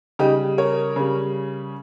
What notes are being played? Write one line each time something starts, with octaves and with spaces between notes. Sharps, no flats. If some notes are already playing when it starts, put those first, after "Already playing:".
C#3 G3 D#4 G4
A#4 C#5
C#3 G3